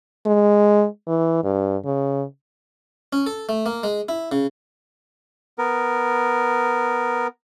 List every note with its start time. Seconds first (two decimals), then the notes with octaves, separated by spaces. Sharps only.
0.26 G#3
1.07 E3
1.44 G2
1.85 C#3
3.13 C#4
3.26 A4
3.49 A3
3.66 A#3
3.83 G#3
4.09 E4
4.32 C#3
5.58 B3 A#4